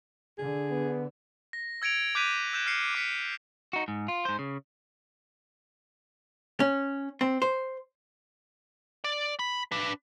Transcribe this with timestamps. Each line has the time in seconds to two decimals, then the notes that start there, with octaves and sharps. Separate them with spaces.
0.38 D3 G#4
0.71 B3
1.53 A#6
1.82 E6 G#6 C#7 D7 F7
2.15 D6 F#6 G6 B6 D#7 F7
2.53 E6 F#6 G6 E7
2.66 F6 G#6 C7 C#7
2.95 D6 B6 C#7
3.73 D#4 F#4
3.88 G#2
4.08 F4
4.25 G#2 C5
4.39 C#3
6.60 C#4
7.21 C4
7.42 C5
9.04 D5
9.39 B5
9.72 D4 B4